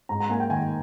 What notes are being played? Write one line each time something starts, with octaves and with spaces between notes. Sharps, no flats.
G#2 A#5
A#5
A#3 G#5
G5
D#3 G#5